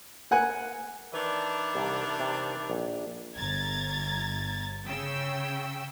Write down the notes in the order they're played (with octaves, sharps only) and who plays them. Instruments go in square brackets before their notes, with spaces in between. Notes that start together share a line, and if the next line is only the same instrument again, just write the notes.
[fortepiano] A#4 F#5 G#5
[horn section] D#3 E3 D4 [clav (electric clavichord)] B4
[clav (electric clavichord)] C2 A#5
C3
A#1
[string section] G1 A#5 G#6 A6
C#3 G5 E6